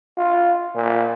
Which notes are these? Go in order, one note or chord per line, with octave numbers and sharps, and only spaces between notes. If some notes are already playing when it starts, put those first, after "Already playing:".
F4
A#2